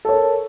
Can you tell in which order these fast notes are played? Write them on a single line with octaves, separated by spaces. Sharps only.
A4 C#5 A#4